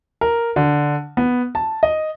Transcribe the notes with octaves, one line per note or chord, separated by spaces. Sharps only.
A#4
D3
B3
A5
D#5